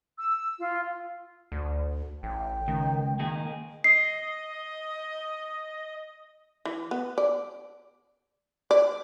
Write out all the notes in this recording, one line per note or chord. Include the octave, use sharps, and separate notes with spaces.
E6
F4
D2
A1 G5
C#2 D#3
D#3 A#3 G#4
D#5 C7
E3
B3
D5
D5